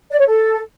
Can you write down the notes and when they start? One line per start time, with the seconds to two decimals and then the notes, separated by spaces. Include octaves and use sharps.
0.10 D5
0.18 C#5
0.26 A4